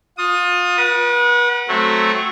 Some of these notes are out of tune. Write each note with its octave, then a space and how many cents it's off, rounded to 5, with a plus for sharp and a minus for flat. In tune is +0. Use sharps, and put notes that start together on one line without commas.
F4 +30 D#6 +0
B4 -40 F#5 +0
F#3 +0 A3 -5 C4 +0